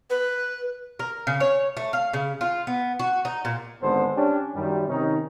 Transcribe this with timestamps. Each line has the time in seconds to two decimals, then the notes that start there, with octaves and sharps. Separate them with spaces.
0.10 B4
0.99 A#4
1.27 C#3
1.40 C#5
1.77 A3
1.93 F5
2.13 C#3
2.41 F4
2.67 B3
2.99 F#4
3.25 D#4
3.45 A#2
3.82 G#1 D3 G#3 B3 A4 C5
4.15 C#4 D4 G4
4.55 F#2 D#3 G3
4.89 C3 D#3 C#4 D#4